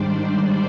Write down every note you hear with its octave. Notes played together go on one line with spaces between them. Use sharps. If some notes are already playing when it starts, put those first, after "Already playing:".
Already playing: G#2 D#3 G3 D4 C5 D5